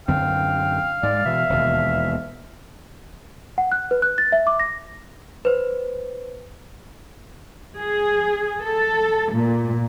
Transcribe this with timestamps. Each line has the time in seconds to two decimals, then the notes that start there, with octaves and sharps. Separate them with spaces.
0.08 F#2 D3 C4 F5 G5
1.03 G#2 G#3 D5
1.25 B2 E3 E5
1.50 E1 D#2 B2
3.58 F#5
3.72 F#6
3.91 B4
4.02 F#6
4.18 A6
4.32 E5
4.47 D6
4.60 A#6
5.45 B4 C5
7.78 G#4
8.61 A4
9.33 A#2